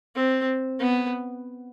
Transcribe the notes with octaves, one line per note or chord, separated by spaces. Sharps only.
C4
B3